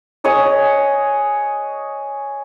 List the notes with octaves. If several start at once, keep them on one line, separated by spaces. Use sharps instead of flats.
G#4 C#5 D#5 F#5